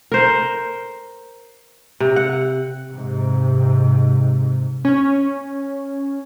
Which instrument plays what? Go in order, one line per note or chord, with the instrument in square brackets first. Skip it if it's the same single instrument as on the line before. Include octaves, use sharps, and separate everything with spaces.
[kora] A#4 C5
C3
F#5
[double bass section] G#2 C3
[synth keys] C#4